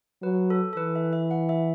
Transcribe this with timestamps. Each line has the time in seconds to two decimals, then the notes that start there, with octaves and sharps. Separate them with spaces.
0.23 F#3 B4
0.50 A4
0.73 A4
0.77 E3 B4
0.95 E5
1.13 E5
1.31 F#5
1.49 E5